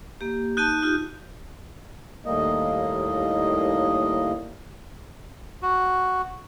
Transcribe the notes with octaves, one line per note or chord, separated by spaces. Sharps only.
A#3 G4
D#4 A5 F#6 G6 D#7
D#4 F4 G4
D#2 A2 G3 A#3 D#5
F#4